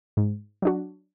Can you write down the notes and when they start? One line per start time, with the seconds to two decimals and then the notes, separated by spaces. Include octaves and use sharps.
0.17 G#2
0.62 F#3 D4 F#4